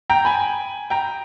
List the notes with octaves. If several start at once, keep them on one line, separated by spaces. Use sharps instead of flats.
G5 A#5
G#5 B5
G5 A#5